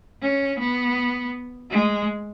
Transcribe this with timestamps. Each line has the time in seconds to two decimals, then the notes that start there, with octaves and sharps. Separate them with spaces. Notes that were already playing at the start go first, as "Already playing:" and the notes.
0.21 C#4
0.59 B3
1.70 G#3